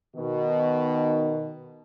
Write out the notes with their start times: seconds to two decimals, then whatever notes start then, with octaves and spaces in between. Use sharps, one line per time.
0.16 B2 D#3